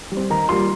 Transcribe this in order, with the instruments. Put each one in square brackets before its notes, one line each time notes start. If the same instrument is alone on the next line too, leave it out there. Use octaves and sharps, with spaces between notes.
[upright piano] G3
C4
D#3 A#5
G3 A#3 F4 C6